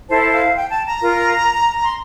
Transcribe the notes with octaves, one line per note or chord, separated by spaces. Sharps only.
E4 A4 C5 A5
F5
G5
A5
A#5
F4 A#4
C6